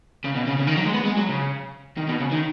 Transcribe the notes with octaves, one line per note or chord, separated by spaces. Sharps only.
C#3
B2
C#3
C#3
D#3
F#3
G#3
B3
G#3
F#3
C#3
D#3
B2
C#3
D#3